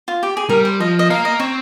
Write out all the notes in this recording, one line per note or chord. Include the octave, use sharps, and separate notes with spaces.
F4
G4
G#4
G3 A#4
C5
F3 D#5
D#5
A#3 F5
D#5
C4 C#5